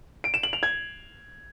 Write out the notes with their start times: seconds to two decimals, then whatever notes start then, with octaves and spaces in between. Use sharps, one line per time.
0.24 D7
0.34 E7
0.43 F#7
0.53 F7
0.63 G#6